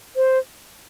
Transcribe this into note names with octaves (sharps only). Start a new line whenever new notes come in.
C5